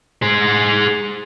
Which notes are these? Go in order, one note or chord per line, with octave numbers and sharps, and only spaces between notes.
G#4 C5